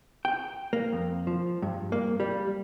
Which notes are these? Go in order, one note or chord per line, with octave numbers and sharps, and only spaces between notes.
G5
A#3
F2
F3
G2
A#3
G3